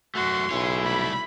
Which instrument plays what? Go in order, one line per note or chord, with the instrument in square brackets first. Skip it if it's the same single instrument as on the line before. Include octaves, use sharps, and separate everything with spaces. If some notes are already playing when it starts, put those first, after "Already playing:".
[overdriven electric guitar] F#2 A3 [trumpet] F#4 [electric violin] C6
[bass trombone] B1 [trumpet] E4 [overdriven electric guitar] G#4 C#5
[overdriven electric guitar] C2 A3 [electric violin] B5